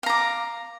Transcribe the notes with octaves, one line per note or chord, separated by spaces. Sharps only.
F5 A#5 D6